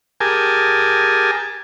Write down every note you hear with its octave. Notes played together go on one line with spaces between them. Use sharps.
G4 G#4 A#4 G#5 A5